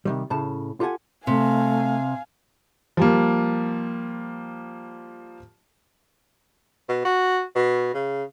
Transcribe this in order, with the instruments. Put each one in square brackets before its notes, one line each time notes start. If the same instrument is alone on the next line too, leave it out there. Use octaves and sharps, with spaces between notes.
[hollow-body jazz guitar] C3 D#3 G3
A2 C#3 A5
F4 G4 A4 F#5 G#5
[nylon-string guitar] C3 [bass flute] A3 [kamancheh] F5 G#5
[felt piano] F3 G3 A#3
[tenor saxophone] B2
F#4
B2
C#3